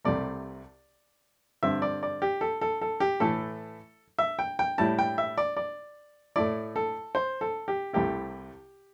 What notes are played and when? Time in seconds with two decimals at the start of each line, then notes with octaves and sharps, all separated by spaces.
0.05 C2 C3 A3 D5
1.63 G2 D3 C4 E5
1.82 D5
2.03 D5
2.22 G4
2.41 A4
2.61 A4
2.81 A4
3.00 G4
3.20 A2 E3 A3 E4 A4
4.19 E5
4.39 G5
4.59 G5
4.78 A2 G3 E4 A5
4.99 G5
5.18 E5
5.38 D5
5.57 D5
6.36 A2 A3 E4 D5
6.76 A4
7.15 C5
7.41 A4
7.68 G4
7.93 C2 C3 A3 E4 G4